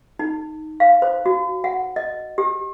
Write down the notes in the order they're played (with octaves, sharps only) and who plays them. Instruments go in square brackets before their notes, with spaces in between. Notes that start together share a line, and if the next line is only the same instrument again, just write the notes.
[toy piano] D#4
F5
C5
F#4
F#5
D#5
G4